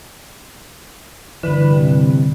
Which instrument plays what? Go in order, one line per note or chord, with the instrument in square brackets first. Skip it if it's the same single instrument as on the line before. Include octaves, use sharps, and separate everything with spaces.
[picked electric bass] G2 E3 [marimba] D3 [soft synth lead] B4
[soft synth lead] C3